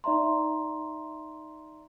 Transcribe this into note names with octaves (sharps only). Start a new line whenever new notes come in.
D#4 D5 E5 A#5 C6